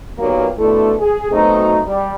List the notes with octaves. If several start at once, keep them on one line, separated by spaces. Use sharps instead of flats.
A#2 D#3 F#3 A#3 B3 G4
B2 D3 A3 E4 A4
G#4
B2 F#3 A3 C4 D#4
G3